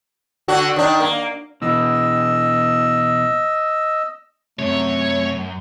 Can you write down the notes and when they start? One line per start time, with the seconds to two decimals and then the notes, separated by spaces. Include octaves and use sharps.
0.48 D3 D4 F#4
0.76 D#3 D4
1.00 A#3
1.62 B2 E3 D#5 E6
4.59 F#2 C3 A3 C#5